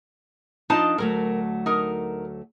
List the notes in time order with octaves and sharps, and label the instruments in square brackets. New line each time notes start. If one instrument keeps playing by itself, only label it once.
[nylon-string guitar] F3 D4 A5 [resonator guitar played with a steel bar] D#4 F4 D#5
[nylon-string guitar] D2 F#3 A3 [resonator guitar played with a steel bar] A#4
[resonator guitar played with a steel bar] D#4 A#4